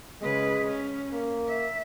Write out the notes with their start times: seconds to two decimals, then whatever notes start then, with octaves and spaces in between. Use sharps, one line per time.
0.22 C#3 G#3 B4
0.67 C#4
1.13 A#3
1.48 E5